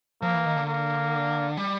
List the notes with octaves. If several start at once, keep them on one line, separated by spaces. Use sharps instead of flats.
F3 A#3
E3
D#3
D3
A#3
G3